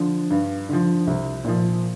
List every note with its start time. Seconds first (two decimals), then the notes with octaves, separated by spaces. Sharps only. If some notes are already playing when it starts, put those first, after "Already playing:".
Already playing: D3 F3
0.31 G2
0.69 D3 F3
1.07 C2
1.45 A#2 F3